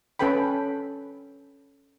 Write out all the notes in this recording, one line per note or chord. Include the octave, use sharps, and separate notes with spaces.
C#4 A4 B4 G5 B5